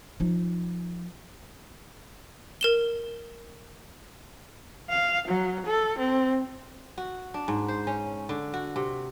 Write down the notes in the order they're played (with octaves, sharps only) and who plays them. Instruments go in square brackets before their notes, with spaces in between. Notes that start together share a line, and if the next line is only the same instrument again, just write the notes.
[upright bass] F3 D#4
[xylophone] A#4 E7 G7
[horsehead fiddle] F5
F#3
A4
C4
[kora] F#4
D4
G#2
C5
C#4
D3
F#4
C3